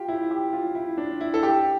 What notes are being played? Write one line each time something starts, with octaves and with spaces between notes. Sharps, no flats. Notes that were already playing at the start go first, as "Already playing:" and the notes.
Already playing: F4 G4
E4
G4
F4
E4
D4
E4
A4
G4